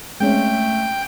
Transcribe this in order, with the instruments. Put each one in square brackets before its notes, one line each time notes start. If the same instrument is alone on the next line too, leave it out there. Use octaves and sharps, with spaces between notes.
[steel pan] G#3 C4 C#4 [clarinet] A3 [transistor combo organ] G5